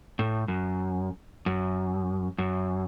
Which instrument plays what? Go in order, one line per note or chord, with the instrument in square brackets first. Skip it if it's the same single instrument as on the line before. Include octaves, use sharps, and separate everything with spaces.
[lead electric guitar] A2
F#2
F#2
F#2